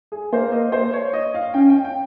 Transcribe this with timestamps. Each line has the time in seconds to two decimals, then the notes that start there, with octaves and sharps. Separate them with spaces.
0.12 G#4
0.32 A#3 C5
0.52 D#5
0.72 C5
0.93 C#5
1.13 D#5
1.34 F5
1.54 C#4 G5
1.70 G5
1.84 G5